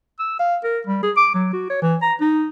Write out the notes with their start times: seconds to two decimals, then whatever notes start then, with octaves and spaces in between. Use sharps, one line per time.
0.19 E6
0.39 F5
0.64 A#4
0.87 G3
1.03 G#4
1.17 D6
1.34 F#3
1.53 F#4
1.70 C#5
1.82 E3
2.02 A#5
2.21 D#4